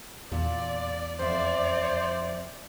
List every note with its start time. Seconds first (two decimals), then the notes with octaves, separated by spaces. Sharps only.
0.32 E2 A#2 D5
1.19 F2 C5 D5 E5